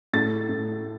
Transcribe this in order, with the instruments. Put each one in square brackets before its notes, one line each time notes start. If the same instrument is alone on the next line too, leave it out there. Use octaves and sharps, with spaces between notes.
[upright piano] A2 A6
A2